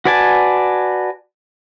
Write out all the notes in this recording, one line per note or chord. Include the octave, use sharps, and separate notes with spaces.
F#4 B4 D5 G#5 A5